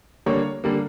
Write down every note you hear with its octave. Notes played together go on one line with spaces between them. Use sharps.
D3 G3 A#3 C#5
D3 G3 A#3